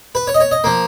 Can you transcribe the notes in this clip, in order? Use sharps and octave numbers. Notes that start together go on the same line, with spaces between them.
B4
C#5
D#5
C#5
D#5
F3 A#3